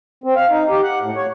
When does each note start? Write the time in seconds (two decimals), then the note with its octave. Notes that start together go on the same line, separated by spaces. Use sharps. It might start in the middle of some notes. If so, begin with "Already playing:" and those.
0.24 C4
0.36 F5
0.49 D#4
0.69 G4
0.83 F#5
1.01 A2
1.16 C#5